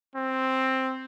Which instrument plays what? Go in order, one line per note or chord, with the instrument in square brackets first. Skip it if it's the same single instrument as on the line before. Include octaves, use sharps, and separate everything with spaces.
[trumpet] C4